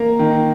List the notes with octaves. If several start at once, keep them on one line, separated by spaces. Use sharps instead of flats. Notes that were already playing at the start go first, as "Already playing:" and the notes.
Already playing: A#3 A#5
D#3